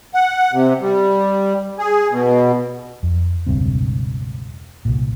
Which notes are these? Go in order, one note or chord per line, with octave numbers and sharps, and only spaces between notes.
F#5
C3
G3
G#4
B2
F2
E1 C#2 G2 C4
C2 A#2